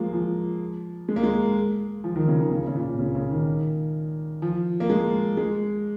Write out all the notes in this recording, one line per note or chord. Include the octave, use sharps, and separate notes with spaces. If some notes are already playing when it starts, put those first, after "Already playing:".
Already playing: F3 G#3 A#3
F3
G#3
A#3
G#3
F3
D#3
C#3
D#3
C#3
C#3
A#2
C#3
C#3
D#3
F3
A#3
G#3
G#3